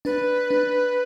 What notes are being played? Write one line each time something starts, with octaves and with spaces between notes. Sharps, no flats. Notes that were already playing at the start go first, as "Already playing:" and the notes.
D4 B4
D4